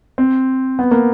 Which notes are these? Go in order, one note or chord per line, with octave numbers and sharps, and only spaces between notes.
C4
B3
A#3